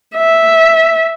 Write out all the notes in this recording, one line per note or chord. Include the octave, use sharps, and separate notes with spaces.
E5